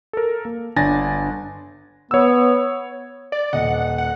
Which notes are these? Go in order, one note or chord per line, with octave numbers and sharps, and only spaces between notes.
A4 A#4
A#3
G1 D4 G#5 A6 A#6
B3 C#5 E6
D5
D#1 D#5 F#5
F#5